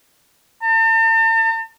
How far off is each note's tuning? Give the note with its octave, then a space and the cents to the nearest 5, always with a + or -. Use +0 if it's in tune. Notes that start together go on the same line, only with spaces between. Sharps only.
A5 +45